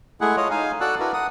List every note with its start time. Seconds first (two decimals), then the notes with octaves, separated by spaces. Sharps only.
0.21 G#3 A3 E4 G#4 F#5
0.37 F4 C#5 D#5
0.51 D#4 F5 G#5
0.81 F#4 A4 D5 F#5 E6 F#6
0.99 D4 E4 F#4 A#4 B4
1.13 F#5 D#6